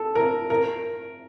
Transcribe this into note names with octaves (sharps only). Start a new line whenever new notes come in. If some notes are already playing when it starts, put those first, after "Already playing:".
Already playing: A4
A#4
A#4